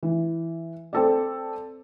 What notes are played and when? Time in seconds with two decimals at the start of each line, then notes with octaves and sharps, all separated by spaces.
0.03 E3
0.93 C4 A4 D5